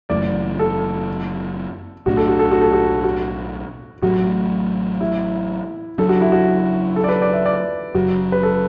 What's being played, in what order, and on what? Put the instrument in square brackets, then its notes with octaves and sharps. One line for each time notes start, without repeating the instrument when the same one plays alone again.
[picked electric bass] F#1 F#2 E3 A3 [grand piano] D5
[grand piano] A4
[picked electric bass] B1 A2 F#3 D4 [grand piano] F#4
[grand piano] A4
F#4
A4
F#4
A4
F#4
F#4
[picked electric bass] A1 A2 F#3 A3 [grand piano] F#4
[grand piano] E4
[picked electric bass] F#1 F#2 F#3 D4 [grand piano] A4
[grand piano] F#4
E4
F#4
A4
D5
B4
D5
E5
D5
[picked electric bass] F#1 F#2 F#3 [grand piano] F#4
[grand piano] B4
A4